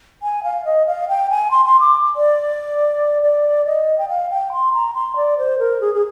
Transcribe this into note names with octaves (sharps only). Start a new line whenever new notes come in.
G#5
F5
D#5
F5
G5
G#5
C6
C6
D6
D5
D5
D#5
G5
F5
G5
C6
A#5
C6
D5
C5
A#4
G#4
G#4